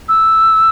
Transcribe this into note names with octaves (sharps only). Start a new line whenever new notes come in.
E6